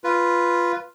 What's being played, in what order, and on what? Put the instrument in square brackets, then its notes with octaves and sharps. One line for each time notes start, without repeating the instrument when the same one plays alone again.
[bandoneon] F4 B4